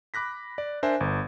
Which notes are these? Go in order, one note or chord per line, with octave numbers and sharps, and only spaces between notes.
B5 D6 F#6 A#6 B6
D5
D4 A#4 C5 E5 G#5
G1